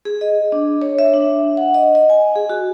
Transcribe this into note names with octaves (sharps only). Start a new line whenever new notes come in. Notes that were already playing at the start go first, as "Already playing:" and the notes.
G#4
D#5
D4
C#5
E5
D4
F#5
D#5
D#5
G#5
G#4
F#4